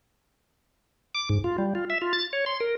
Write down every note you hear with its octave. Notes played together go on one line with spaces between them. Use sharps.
D6
G#2
F4
G3
F4
E5
F4
A6
C#5
C6
A#4